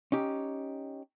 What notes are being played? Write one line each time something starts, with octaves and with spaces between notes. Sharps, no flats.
C#4 D#4 G4